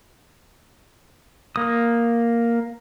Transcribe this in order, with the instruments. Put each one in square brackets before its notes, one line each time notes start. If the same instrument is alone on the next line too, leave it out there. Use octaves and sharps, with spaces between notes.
[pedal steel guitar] A#3 D#6